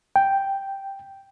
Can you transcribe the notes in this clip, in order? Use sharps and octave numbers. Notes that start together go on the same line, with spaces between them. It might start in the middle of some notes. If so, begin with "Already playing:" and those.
G5